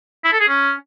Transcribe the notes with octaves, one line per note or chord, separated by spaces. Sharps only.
E4
A4
G#4
C#4